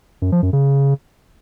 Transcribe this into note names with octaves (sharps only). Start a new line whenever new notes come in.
F#2
F3
F#2
C#3